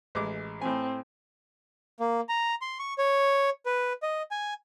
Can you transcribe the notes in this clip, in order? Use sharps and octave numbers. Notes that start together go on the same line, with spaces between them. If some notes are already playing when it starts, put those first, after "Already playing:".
A1 G#3 D6
A2 C4 G#5
A#3
A#5
C6
C#6
C#5
B4
D#5
G#5